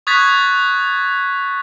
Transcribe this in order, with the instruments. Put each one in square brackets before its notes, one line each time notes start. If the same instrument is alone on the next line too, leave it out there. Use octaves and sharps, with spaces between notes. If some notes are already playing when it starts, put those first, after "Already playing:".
[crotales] C#6 D#6 F#6 G#6 A6 B6